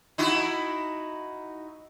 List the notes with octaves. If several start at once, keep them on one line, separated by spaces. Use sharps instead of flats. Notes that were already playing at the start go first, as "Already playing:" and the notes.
D#4 E4 F#4